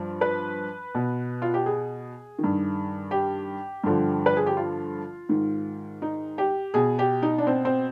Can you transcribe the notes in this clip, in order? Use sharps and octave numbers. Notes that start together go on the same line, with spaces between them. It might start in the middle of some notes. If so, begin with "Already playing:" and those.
Already playing: G2 F3
B4
B2
F4
G4
G#4
D#3
G2
G4
G2 D3 F3
B4
G#4
G4
F4
G#2 D#3
D#4
G4
B2 G#4
G4
D#4
D4
C4
C4